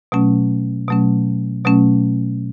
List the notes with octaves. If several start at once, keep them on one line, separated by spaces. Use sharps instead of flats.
B2 F#3 A3 C#4
B2 F#3 A3 C#4
B2 F#3 A3 C#4